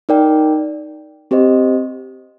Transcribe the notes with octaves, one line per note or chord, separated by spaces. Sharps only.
D#4 A#4 D5 G5
C4 G4 C5 D#5